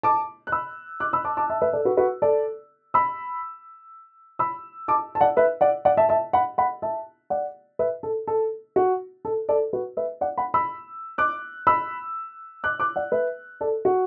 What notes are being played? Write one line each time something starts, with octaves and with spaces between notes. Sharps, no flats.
A5 D6
F#6
B5 E6
D6 F#6
B5 E6
A5 D6
A5 D6
E5 A5
B4 E5
A4 D5
F#4 B4
F#4 B4
A4 D5
B5 E6
B5 E6
A5 D6
A5
D5 F#5
B4 E5
D5 F#5
D5 F#5
E5 A5
E5 A5
F#5 B5
F#5 B5
E5 A5
D5 F#5
B4 E5
A4
A4
F#4
A4
A4 D5
F#4 B4
B4 E5
D5 F#5
F#5 B5
B5 E6
D6 F#6
B5 E6
D6 F#6
D6 F#6
D5 F#5
B4 E5
A4 D5
F#4